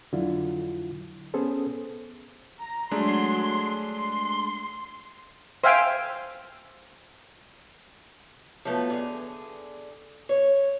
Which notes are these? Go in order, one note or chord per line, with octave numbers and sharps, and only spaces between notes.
F2 D3 F#3 E4 F4
B3 C#4 G#4 A4 C5
A#5
F#3 G#3 A3 D4 C6
C6
C5 E5 F5 G5 G#5
F3 F#3 A3 B3 F#4
D3 G#4
C#5